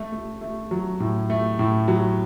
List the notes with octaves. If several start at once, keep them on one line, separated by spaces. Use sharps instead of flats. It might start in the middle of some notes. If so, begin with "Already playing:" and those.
Already playing: A3
A3
A3
F#3
A2
A3
A2
F#3